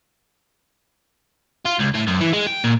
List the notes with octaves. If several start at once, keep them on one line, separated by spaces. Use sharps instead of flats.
F4
C#2
A2
F#2
E3
G#3
G5
A#2